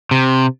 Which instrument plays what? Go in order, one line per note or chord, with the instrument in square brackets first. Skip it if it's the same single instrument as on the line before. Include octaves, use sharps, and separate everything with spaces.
[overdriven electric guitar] C3